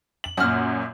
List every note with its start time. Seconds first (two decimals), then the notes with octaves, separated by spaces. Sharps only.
0.24 F#7
0.37 F#2 A#2 F#4 F#5 F6